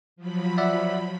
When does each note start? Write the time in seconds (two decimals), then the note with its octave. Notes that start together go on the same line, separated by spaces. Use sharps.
0.16 F3 F#3 B5
0.58 D5 E5 F#5